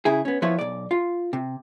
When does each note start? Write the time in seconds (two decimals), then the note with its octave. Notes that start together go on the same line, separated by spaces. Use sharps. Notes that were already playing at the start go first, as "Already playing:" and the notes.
0.05 C#3 E4 G#4
0.25 B3 C#4
0.42 F3 B3 E4 F4 C#5
0.59 B1 D5
0.91 F4
1.33 C3